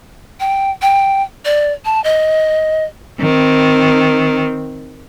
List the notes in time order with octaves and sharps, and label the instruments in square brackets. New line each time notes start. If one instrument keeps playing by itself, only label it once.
[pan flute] G5
G5
D5
A5
D#5
[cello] D#3 C4